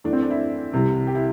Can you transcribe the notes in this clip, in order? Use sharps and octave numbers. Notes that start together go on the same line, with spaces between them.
E2 E3 A3 D4
C4
D4
E4
C2 C3 E3
G4
E4